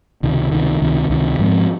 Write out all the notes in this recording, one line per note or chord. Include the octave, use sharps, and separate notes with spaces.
C#2 C3 D#3
C#2 C3 D#3
C#2 C3 D#3
C#2 C3 D#3
G#2 F3 G#3 C4